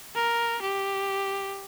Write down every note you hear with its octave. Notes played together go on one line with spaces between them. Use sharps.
A#4
G4